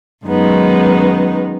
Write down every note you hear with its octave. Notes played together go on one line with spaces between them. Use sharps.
F#2 D#3 G#3 B3 D#4